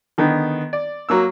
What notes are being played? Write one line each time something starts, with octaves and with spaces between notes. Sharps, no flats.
D3 D#3 B3
D5
F#3 A#3 E6